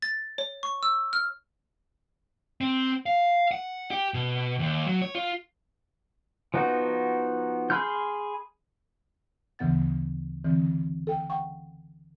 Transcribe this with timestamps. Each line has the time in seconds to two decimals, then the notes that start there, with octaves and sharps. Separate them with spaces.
0.02 A6
0.38 C#5
0.63 C#6
0.83 E6
1.13 F6
2.61 C4
3.06 F5
3.51 F#5
3.91 G4
4.14 B2
4.59 D#2
4.87 F#3
5.02 C#5
5.15 F4
6.54 F3 B3 D#4 F#4
7.70 G#4 B5 C6 F6 G6
9.59 D2 C#3 E3 B3 F#5 A6
10.44 D3 E3 C4
11.07 A4 G5
11.30 F#5 G5 C#6